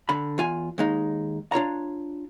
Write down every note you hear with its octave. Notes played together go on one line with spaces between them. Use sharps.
D3 B5
E2 F4 G#5
D#2 G#3 D#4
D4 F4 C#5 A#5